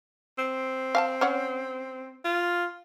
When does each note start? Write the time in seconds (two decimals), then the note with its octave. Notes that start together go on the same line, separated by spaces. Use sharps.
0.38 C4
0.95 F5 G#5 A5
1.21 C#4 C#5 F#5
2.25 F4